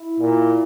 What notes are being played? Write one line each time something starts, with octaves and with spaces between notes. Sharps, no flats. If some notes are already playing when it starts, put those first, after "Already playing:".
Already playing: E4
A#2